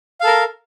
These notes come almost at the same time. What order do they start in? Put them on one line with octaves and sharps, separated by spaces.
F5 A4 A#4